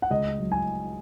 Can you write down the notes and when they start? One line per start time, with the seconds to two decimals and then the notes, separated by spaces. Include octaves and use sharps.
0.02 F#5
0.10 C#2 D#5
0.39 F#3
0.52 G#5